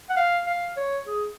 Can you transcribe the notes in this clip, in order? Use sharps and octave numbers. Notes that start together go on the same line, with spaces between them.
F#5
F5
F5
C#5
G#4